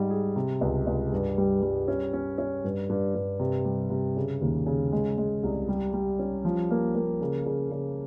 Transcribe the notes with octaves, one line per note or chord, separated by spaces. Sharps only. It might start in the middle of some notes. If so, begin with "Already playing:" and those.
Already playing: G#2 G3
G#4
C3
C#2
C#2
G2
G3
G3
C#4
C#4
C#4
G2
G2
G2
C3
G3
C3
C#3
D#2
C#3
G#3
G#3
C2
G3
G3
C#4
F3
A#3
A#3
C#3
C#3
C#3